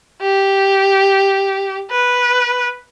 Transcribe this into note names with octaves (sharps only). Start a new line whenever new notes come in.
G4
B4